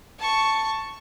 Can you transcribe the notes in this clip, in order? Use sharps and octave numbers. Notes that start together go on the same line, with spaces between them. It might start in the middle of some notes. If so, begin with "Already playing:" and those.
A5 C#6